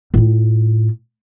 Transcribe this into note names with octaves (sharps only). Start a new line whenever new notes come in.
A2 F4